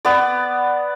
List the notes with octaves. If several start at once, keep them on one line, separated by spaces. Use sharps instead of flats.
B3 D5